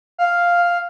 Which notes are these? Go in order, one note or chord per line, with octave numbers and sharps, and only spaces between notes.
F5